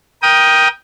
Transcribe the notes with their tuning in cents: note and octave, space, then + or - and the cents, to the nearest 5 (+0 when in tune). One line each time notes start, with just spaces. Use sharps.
A#4 +25 G5 +0 D#6 +0